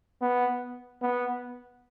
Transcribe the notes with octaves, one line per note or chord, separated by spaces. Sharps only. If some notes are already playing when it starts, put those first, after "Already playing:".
B3
B3